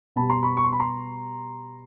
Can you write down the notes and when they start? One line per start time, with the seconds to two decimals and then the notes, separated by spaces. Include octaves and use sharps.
0.16 B2 G3 B3 A5 B5
0.30 A#5 C6
0.43 B5 C#6
0.57 C#6
0.64 C6
0.73 B5
0.80 A#5 C6